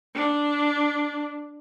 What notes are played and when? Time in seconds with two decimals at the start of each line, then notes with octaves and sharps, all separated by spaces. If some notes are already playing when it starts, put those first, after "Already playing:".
0.15 D4